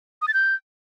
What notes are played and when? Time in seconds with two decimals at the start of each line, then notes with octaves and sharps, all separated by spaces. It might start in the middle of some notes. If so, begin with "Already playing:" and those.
0.22 D#6
0.28 A6
0.34 G6